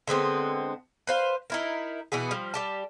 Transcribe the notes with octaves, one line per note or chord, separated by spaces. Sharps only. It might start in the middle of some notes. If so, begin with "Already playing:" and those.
D3 G#3 B3 C4
B4 C5 F5
D#4 E4 A#4
B2 E3 B3 G#4
F3 G3
G3 G4 A5